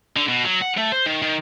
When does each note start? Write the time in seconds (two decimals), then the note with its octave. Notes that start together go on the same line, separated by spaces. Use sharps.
0.17 D3
0.28 B2
0.45 F#3
0.62 F#5
0.78 A3
0.92 C5
1.06 D#3
1.22 D#3